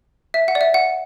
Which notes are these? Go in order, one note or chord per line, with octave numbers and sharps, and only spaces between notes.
E5
F#5
D5
E5
F#5